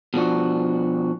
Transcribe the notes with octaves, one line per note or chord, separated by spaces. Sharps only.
B2 F3 D4 F#4